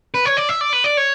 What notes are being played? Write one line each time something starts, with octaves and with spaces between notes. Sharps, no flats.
B4
C#5
D5
E5
D5
B4
D5
C#5